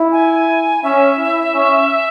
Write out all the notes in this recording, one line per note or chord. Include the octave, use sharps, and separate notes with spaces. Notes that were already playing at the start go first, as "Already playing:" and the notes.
Already playing: E4
G#5
C#4 E5
E4
C#4